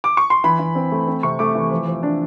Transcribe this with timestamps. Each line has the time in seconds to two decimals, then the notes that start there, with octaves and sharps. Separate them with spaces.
0.04 D6
0.17 C#6
0.30 C6
0.44 E3 B5
0.59 E3
0.75 C4
0.92 A3
1.07 C4
1.23 C3 C#6
1.39 A3 D6
1.55 E3
1.71 F3
1.87 F3
2.03 D4